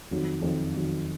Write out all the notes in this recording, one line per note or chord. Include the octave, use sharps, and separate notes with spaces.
F2 D#3 F#3
F2 D#3 F#3
F2 D#3 F#3